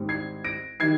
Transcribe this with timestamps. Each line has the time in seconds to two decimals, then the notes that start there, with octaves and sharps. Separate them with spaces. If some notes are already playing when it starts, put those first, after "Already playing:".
Already playing: G#2 D#3 G3 C4
0.09 G#6 C7
0.44 A#6 D7
0.80 D#3 G3 G#6 C7